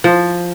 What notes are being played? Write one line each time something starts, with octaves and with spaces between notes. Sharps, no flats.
F3